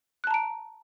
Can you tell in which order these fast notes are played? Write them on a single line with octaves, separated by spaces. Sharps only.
F#6 A5 A#5 D7